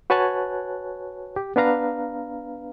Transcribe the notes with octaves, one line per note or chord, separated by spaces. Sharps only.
F#4 B4 C#5 G#5 A5 F#6
G4
B3 D4 B4 F5 A#5